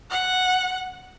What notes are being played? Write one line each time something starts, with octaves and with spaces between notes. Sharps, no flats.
F#5